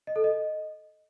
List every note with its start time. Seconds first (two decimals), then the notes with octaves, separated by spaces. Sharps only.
0.07 D#5
0.16 A4
0.24 D#5